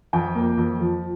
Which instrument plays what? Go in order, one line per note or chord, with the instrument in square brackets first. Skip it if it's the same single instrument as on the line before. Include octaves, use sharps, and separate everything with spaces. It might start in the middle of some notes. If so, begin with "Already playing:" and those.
[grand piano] F2 G5
A#3
F2
F3